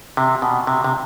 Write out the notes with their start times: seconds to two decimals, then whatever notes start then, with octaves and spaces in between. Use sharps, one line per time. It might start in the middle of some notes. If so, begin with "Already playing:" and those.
0.17 C3
0.42 B2
0.67 C3
0.84 C3